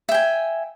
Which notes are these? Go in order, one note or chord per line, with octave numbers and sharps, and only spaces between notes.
E5 G5 G#5